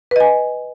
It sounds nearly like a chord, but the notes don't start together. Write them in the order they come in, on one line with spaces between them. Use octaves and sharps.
B4 D#5 G#5